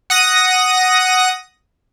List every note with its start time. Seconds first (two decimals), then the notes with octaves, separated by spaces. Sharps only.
0.10 F#5 D#6 A#6